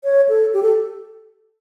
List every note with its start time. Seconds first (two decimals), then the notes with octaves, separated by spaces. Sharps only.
0.04 C#5
0.29 A4
0.53 G4
0.63 A4